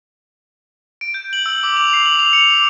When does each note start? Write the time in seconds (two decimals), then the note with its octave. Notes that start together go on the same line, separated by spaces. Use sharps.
1.01 D7
1.14 G6
1.33 F#7
1.46 E6
1.63 D6
1.77 F7
1.93 C7
2.06 F#7
2.19 F7
2.33 C#7
2.51 D6